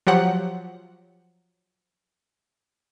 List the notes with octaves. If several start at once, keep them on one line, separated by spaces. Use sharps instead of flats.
F3 F#3 G4 F#5